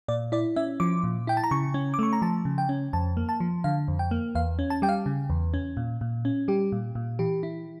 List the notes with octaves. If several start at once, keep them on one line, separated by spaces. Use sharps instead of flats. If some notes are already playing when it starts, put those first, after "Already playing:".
A#2 D5
E4 D5
C#4 E5
F3 D6
A#2
E4 G5
A5
A#5
C#3 C#6
C#4
D6
A3 C#6
A#5
F3 A5
C#3
G5
C#4
F2 A5
A#3
A5
F3
D3 F5
F2
G5
A#3
E2 F5
C#4
A5
G3 G5
F5
C#3
E2
C#4
A#2
A#2
C#4
G3 G4
A#2
A#2
E3 G4
E4